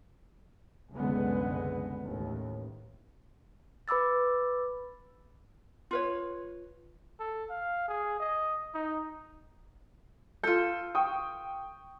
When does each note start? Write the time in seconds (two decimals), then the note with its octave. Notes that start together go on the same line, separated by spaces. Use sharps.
0.94 F#1 C2 D3 G#3 B3
2.05 A1 D#2 A2
3.88 B4 B5 D6 E6 A6
5.91 F4 B4 C#5
7.20 A4
7.50 F5
7.88 G#4
8.20 D#5
8.75 D#4
10.43 F4 A4 G6
10.95 G5 C#6 D#6